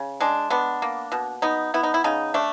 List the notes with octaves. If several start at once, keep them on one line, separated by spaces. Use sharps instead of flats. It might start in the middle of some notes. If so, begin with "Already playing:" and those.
Already playing: C#3
G#3 D4
B3 D4
A#3
B2
B3 D#4
B3 E4
D#4
E4
C#3 D#4
A3 D4